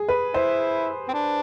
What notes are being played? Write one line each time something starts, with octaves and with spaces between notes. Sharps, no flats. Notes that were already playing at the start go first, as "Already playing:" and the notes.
Already playing: G#4
B4
E4 C5
C4
D4